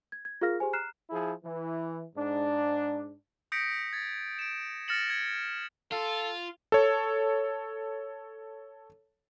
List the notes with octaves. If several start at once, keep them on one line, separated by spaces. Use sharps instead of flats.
G#6
G#6
F4 G#4 A#4 F5 F6 A#6
G4 G#4 C5 G#5
A#5 F6 F#6 C7 E7
F3 E4 G#4
E3
G#2 D4
D#6 G6 A#6 B6 C#7 D7
G#6 A6
D7 E7
F6 A6 A#6 C#7 E7 F#7
G#6 C#7
F4 A4
A4 C#5